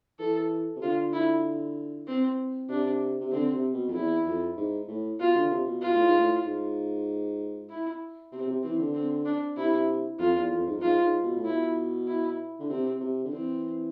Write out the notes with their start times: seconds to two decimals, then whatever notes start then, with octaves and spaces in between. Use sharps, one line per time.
0.19 E3 A4
0.76 C3
0.82 D3 F4
1.13 E4
2.07 C4
2.69 C3 D4
3.20 C3
3.32 D3 C4
3.53 C3
3.74 B2
3.88 F2
3.94 E2 E4
4.26 F2
4.57 G#2
4.88 A2
5.20 B2 F4
5.35 D3
5.51 C3
5.67 B2
5.82 B2 F4
5.93 A2
6.06 G#2
6.17 A2
6.44 G#2
7.70 E4
8.32 C3 C4
8.47 C3
8.63 E3 C4
8.79 D3
8.94 C4
9.26 D4
9.57 C3 E4
10.19 F2 F4
10.35 E2
10.51 F2
10.67 G#2
10.77 F2
10.82 G#2 F4
11.03 G#2
11.24 B2
11.36 A2
11.45 B2 E4
12.07 E4
12.60 D3
12.69 C3 C4
13.00 C3
13.24 D3
13.32 E3 C4